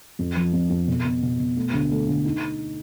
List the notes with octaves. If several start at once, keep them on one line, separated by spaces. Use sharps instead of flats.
F2
F3
F2
F2
B2
B2
B2
B2
A3
D2
A3
D2
D#4